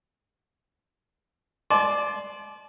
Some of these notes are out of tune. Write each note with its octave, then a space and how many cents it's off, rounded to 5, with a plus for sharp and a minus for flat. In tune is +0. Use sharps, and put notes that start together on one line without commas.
D5 +0 A5 -40 C6 +0